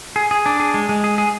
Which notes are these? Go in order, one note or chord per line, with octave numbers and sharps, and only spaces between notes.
G#4
G#4
D4
G#4
G#3
G#3
G#4
G#4